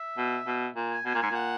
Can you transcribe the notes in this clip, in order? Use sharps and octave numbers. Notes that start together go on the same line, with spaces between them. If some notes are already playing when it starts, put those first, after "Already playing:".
Already playing: E5
B2
B2
A#2
G#5
B2 G#5
A#2
G#2 G#5
A#2 F#5